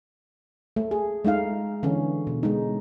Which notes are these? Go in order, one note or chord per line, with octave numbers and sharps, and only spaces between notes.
A3
G#4
G#3 A3 D#4 F5
D3 E3 C#4
B2
G#3 D#4